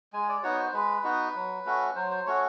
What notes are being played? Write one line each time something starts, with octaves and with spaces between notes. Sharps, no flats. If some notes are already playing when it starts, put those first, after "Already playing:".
G#3 G#5
D5
B3 D#4 F#4 C#5
C5
G#3 B4
B3 D#4 F#4
F#3
A3 C#4 F#4
F#3 C5
C5
A3 C#4 F#4 C#5